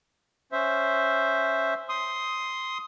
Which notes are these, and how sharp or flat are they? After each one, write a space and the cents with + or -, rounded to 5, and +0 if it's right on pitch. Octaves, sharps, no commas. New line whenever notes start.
C#4 +0 C5 +0 E5 +0
C6 +0 D#6 +15